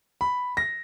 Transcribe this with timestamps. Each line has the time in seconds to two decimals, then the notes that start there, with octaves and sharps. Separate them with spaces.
0.21 B5
0.57 A#6